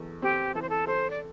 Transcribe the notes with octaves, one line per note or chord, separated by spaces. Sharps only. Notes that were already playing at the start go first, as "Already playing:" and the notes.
Already playing: E2 A4
C4 G4
E3 A4
C5
A4
A4 C5
D5